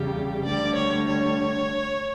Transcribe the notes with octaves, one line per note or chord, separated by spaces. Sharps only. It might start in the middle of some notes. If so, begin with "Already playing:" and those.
Already playing: E2 C#3 G3 G4
D2 D3 G3 D5
C#5
C#5